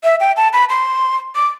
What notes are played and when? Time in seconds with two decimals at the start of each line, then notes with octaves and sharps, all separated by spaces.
0.04 E5
0.20 G5
0.37 A5
0.53 B5
0.70 C6
1.35 D6